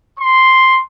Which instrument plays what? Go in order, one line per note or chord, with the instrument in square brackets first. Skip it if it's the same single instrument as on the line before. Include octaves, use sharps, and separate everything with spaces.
[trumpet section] C6